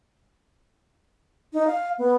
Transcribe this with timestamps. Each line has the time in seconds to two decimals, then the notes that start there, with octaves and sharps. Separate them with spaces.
1.53 D#4
1.67 F5
1.98 B3